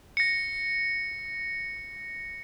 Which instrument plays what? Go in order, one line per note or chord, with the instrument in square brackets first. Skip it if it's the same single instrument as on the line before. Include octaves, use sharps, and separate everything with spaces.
[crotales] A#6 C#7